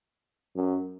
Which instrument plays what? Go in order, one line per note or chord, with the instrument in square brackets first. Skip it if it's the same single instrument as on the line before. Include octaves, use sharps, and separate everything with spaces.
[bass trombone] F#2